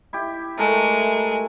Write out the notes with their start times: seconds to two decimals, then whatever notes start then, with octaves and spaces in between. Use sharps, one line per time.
0.13 E4 G4
0.59 G#3 A3 A4 A#4